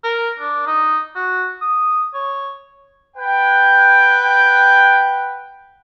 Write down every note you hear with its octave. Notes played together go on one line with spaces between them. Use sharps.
A#4
D4
D#4
F#4
D#6
C#5
B4 F#5 G5